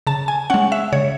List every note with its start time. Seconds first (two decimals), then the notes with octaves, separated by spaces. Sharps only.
0.07 C#3 A5
0.28 G#5
0.50 G#3 C#4 F#5
0.72 E5
0.93 C#3 C#5